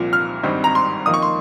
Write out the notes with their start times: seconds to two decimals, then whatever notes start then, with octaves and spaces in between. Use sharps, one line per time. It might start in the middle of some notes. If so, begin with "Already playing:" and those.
Already playing: C2 A#2 F3
0.13 F6
0.43 G#1 G2 G3 C4 D#4
0.64 A#5
0.75 C6
1.06 F2 D#3 A#3 D#4 D#6
1.14 C#6
1.22 C6